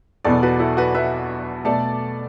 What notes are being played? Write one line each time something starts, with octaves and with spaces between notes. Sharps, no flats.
E2 B2 B3 A4 D5
F#4 B4
E4 A4
F#4 B4
B4 E5
B2 A3 A4 D5